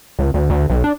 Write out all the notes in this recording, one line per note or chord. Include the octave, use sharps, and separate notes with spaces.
C#2
D2
D2
B1
D4